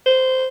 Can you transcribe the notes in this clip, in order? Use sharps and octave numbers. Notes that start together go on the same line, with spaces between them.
C5